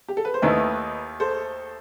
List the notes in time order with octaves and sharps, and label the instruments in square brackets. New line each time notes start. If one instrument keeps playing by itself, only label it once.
[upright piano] G4
A4
B4
C5
[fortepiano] D#2 D#3 A3 E4 [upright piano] B4 D#5
[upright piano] A4 C5